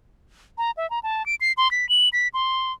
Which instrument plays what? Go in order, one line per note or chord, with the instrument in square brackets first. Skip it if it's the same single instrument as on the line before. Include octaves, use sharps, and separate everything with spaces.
[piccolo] A#5
E5
A#5
A5
D7
C7
C6
B6
F#7
B6
C6